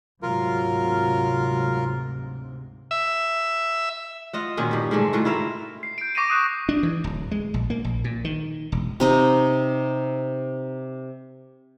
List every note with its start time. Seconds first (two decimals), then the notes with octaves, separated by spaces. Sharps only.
0.22 D2 G#2 C3 F#3 F4 A#4
2.91 E5
4.33 F4 D#5 F#5
4.57 A#2 D#3 C#4 F#4
4.71 G2 G4
4.91 G#2 D3 G#3 A3
5.13 A2 D#3 F4 F#4
5.25 E4 F4 A#4 E5
5.83 C7
5.98 G6 D7
6.15 C#6 D6 A#6 C7 D7 D#7
6.30 D#6 F#6 E7
6.69 D4
6.83 E3
7.04 D1
7.31 G#3
7.54 A#1
7.70 A#3
7.85 A#1
8.04 A#2
8.25 D#3
8.72 E1
9.00 C3 D#4 D#5